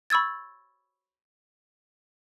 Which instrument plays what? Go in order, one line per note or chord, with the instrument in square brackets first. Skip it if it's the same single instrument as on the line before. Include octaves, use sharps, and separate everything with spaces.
[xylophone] B5 C#6 E6 G#6 A6